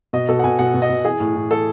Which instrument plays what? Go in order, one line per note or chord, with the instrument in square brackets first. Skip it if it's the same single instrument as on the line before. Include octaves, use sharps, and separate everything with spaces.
[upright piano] B2 D#5
B2 A4
F#5
B2 G#5
B2 F#5
B2
D#5
B2
E3 G#4
A2
A2
E3 A4